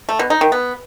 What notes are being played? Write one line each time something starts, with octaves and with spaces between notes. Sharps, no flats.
A3
B2
D#4
D#3
B3